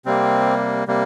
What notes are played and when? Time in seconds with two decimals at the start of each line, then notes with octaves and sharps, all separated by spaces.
0.05 C3 G3 A#3 C4
0.87 C3 G3 A#3